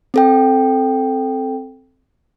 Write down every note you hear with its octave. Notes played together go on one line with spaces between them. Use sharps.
C4 A4 G5